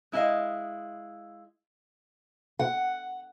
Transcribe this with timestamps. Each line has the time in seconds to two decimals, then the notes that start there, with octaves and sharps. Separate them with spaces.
0.12 G#3 E4 F#4 D#5 F5
2.59 F#5